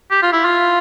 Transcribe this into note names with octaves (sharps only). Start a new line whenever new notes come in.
G4
F4
E4
F4